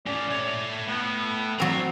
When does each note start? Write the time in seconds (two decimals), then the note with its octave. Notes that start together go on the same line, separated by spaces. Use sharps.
0.07 A3 C#4 D5
0.30 A2 C#5
0.88 A2 B3
1.60 F#3 C4 D5 A#5